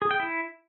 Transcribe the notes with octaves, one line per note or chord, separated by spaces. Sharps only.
G#4
G5
E4